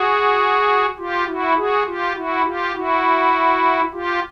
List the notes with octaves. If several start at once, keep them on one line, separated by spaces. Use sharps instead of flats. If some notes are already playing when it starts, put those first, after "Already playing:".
Already playing: F#4 G#4
F4 G4
E4 F#4
F#4 G#4
F4 G4
E4 F#4
F4 G4
E4 F#4
F4 G4